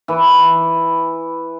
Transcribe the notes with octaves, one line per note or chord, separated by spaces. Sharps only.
E3